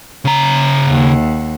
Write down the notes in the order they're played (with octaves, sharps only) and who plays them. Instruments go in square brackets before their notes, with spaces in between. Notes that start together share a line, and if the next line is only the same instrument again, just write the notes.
[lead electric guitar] C#3 A#5
[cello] D#2 F#5